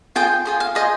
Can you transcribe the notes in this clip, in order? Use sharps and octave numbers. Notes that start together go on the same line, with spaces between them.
F4 G#4 C5 G5
F4 G#4 C5
F5
F4 G#4 C5 D#5